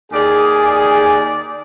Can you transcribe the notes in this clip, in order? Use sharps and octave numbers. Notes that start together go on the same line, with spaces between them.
D#2 G#4 D5